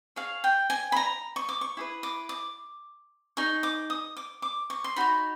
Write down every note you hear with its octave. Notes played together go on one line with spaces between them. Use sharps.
G#4 C#5 F5
G5
G#5
B5
A#5
C#6
D6
C#6
E4 G#4 B4
D6
D6
D#4 G#4 C#6
D6
D#6
D6
D6
C#6
C6
D#4 F#4 C#5 B5